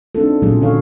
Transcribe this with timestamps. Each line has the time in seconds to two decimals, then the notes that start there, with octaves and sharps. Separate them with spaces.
0.15 C4 D4 D#4 F4 A4
0.42 A#2 F#3 G#3 C#4 F4 G#4
0.61 D3 E3 F#4 A4 C#5 F5